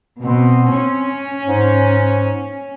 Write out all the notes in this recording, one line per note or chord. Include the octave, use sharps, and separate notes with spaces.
B2 C4
C#4
G#2